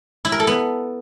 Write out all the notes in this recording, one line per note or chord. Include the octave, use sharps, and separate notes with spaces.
E4
A#4
A4
B3